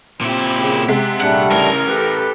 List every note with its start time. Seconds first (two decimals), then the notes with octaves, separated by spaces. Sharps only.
0.21 A#2 C4 E4 G4
0.58 C#3
0.88 C3 G#3 F#5
1.20 A#2 G3 A3 D4 F#5
1.51 A1 C#3 D#4 A#4 G#6
1.87 G4 A4 B4